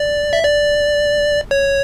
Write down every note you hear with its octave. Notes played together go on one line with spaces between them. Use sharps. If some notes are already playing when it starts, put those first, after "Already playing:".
Already playing: D5
E5
D5
C#5